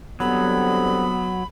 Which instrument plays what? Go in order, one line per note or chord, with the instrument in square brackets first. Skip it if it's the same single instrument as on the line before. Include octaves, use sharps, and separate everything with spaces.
[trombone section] D3 G3 C4 [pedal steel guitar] F#3 [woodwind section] B3 [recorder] B5